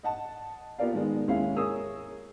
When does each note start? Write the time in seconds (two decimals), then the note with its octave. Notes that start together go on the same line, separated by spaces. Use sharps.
0.03 D#5 F#5 A5
0.79 B3 F4 G4 A#4 D5 F5
0.93 D#3 G#3 B3
1.27 D#2 G#3 C#4 E4 F5
1.56 G#4 A#4 C#5 D#6 E6